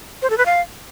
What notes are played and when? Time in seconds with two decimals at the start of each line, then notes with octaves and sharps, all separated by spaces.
0.22 C5
0.30 A4
0.38 B4
0.46 F5